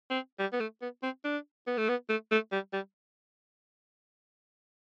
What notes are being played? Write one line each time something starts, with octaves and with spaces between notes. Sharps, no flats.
C4
G3
B3
A3
B3
C4
D4
B3
A3
B3
A3
A3
G3
G3